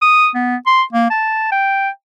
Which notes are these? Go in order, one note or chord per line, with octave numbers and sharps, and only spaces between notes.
D#6
B3
C6
A#3
A5
G5